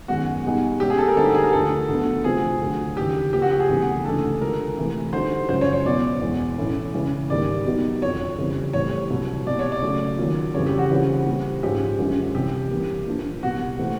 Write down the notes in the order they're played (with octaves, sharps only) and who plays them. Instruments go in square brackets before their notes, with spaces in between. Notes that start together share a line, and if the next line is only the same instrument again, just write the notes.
[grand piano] F#2 D#3 G#3 B3 [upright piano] F#4
[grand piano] B2 G3 B3 D#4 G#4
[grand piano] B2 G#3 C#4 [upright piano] G4
[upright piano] G#4
A4
A#4
[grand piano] D3 G3 C4 D#4 [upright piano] A4
[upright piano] G4
G#4
A#4
[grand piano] D2 D3 F3 [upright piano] A4
[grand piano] D2 D3 F#3 B3
[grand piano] C3 F3 A3 C4 [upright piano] G#4
[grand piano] D2 D3 F#3
[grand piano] D#2 C#3 E3 [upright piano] G4
[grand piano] C#3 F3 A#3 [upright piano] G4
[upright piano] F#4
G4
G#4
[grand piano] D2 C3 E3 G3 B3
[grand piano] C#2 C3 E3 A3 D4 [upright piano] A4
[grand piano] D3 F3 G#3 [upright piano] A#4
[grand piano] C3 E3 A3
[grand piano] D3 G3 C4 D#4 F#4 [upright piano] C5
[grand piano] F#2 C#3 F3 G#3 [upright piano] C5
[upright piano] C#5
C#5
[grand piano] B2 F#3 B3 E4 [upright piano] D5
[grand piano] E2 B2 G#3
A2 E3 A3 C#4 E4
C#3 E3 G#3 C#4
[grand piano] G#2 D#3 G3 A#3 [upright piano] D5
[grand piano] B2 F#3 B3 D#4 G4
[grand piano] F2 D3 F3 [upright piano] C#5
[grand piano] F2 C#3 E3 G3 C4
[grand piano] A2 E3 G3 C4 E4 [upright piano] C#5
[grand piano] C2 A#2 F#3
[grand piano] C2 B2 G3 [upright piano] D5
[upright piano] C#5
D5
[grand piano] C#3 F#3 A3
D#3 F#3 A#3 C#4 F4
[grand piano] F2 C#3 E3 G3 [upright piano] C#5
[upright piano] G4
F#4
[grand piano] C#3 E3 G3 C4 F4
A#2 G3 C4
[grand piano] G#2 F3 G#3 C#4 F4 [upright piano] G4
[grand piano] F#2 D3 F3 G#3 C#4
[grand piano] C2 C3 E3 [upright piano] G4
[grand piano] C3 E3 G3 A#3
A#2 F3 A#3 D4 F4
[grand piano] C2 A#2 G3 B3 [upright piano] F#4
[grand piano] C3 E3 A3 C4